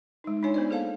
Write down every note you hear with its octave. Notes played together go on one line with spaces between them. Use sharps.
G#3 D#4
D4 D#4 F4 C#5 G#5
B3 C5 D5
A#3 G#4 A4 C5 F5 A5